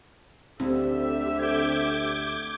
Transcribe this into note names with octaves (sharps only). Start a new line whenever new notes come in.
D2 D3 C4 G4 E5
D6 G6 G#6